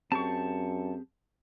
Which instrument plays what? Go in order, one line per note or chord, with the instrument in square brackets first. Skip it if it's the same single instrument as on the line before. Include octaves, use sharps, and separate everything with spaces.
[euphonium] F#2 [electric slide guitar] C4 G4 G#4 [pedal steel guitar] A5 C#6